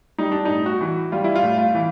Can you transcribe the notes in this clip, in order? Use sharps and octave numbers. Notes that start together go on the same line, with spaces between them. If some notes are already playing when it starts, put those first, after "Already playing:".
G3 D#4
D4
A2 D#4
F#4
E3
G3 F4
E4
F4
A2
F4
E3